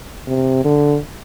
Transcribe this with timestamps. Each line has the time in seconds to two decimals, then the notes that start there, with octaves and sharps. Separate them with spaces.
0.27 C3
0.64 D3